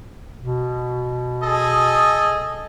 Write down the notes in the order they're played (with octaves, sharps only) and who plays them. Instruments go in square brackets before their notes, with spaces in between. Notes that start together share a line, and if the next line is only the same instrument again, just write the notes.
[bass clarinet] B2
[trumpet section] G#4 A4 D#5